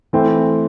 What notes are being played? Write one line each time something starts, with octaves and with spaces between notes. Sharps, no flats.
E3 A3 C4